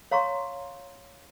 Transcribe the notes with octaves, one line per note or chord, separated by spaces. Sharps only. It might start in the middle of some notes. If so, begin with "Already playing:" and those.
C#5 F5 A#5 C6 C#6